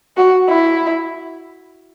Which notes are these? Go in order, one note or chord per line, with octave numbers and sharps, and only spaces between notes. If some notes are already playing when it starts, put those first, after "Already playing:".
F#4
E4